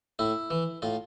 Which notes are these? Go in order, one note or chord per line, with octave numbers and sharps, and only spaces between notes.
A2 E4
E3
A2 F4